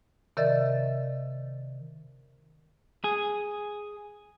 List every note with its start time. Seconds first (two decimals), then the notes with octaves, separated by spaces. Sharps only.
0.37 C3 D#3 A#4 D5 E5 A6
3.04 G#4